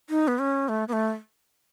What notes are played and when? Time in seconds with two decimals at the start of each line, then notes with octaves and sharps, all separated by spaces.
0.10 D#4
0.28 B3
0.39 C#4
0.69 A3
0.88 B3
0.93 A3